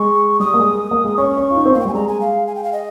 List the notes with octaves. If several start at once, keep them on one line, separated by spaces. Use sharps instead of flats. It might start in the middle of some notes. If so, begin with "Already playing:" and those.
Already playing: G#3 C#6
G3 D#6
A#3
G#3
A#3
G#3
C#4 C#6
C#4
F4
D#4
C4
A#3 F5
G5
G3 G#5
G#3 A#5
G#5
F5
G#5
G5
F5
D#5